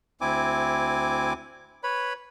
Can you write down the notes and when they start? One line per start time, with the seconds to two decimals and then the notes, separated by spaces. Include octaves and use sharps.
0.21 D2 C4 E4 G#5 D6
1.83 B4 C#5 B5